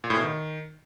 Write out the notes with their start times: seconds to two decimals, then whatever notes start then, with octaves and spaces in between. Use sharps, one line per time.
0.04 A#2
0.10 A2
0.16 B2
0.23 D#3